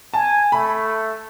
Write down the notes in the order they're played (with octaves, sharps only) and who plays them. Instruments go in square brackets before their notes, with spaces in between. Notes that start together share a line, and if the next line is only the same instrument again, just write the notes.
[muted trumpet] G#5 [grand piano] A5
[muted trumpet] A3 [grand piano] B5